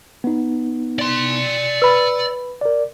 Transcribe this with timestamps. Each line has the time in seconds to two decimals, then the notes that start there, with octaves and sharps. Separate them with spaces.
0.24 B3 D#4
0.99 D5 C6
1.82 B4 B5 E6
2.61 A#4 D5